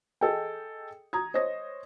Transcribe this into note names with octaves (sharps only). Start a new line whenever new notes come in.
G#4 A4 D#5 G5
A#5 D#6 G#6
C5 C#5 D#5 D#6 A#6